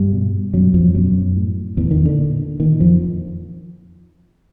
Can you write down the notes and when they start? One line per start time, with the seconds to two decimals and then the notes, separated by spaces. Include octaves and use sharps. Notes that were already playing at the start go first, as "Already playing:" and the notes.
Already playing: G2 G3
0.13 B2
0.53 F#2 B2 F#3
0.74 F2 F3
0.94 F#2 B2 F#3
1.36 A2
1.77 E2 A2 E3
1.91 D#3
2.06 D3
2.19 A#2
2.60 A#2 D#3
2.80 F2 F3